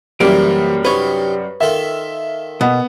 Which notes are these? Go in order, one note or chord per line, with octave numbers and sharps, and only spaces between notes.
F#2 C3 E3 G3 A#3 D5
C3 D#4 B4 C#5
D#3 F4 A4 E5
B2 B3